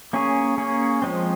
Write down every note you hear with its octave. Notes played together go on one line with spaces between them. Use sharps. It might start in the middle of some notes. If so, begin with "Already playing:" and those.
A#3 C#4 G#4 C#5
A#3 C#4 G#4 C#5
F3 G#3 C4